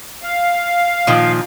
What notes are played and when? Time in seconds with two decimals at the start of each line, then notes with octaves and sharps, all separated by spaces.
0.23 F5
1.07 A#2 D#3 F3